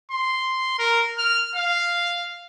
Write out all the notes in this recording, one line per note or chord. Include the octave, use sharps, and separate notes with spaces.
C6
A#4
F6
F5